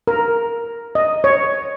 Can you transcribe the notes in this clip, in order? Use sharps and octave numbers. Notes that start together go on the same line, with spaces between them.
A#4
D#5
C#5